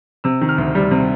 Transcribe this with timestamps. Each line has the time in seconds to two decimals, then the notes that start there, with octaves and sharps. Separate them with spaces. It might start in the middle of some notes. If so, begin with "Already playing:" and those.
0.24 C3 E6
0.41 D#3
0.49 F6
0.58 D2
0.75 G3
0.91 C3